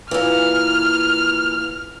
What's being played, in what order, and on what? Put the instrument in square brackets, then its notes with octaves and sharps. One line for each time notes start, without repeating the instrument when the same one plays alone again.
[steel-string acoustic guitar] A#2 E3 [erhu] F6